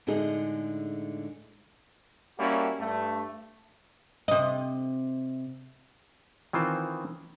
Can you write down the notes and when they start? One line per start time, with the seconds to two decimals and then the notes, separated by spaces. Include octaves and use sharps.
0.07 A2 D3 G#3 D#4 G#4
2.39 G3 A#3 C#4 E4 F#4
2.80 G2 A3
4.28 C3 D#5
6.53 D#3 E3 C4 F4 C5